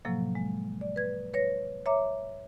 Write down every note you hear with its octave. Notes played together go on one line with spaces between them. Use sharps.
A2 C3 F3 F#3 A#3
G#3
D5
B4 G#6
B4 C#5 A#6
C#5 E5 A#5 D6